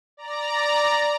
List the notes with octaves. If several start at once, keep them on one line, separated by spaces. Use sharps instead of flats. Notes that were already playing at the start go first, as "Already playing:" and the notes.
D5 A#5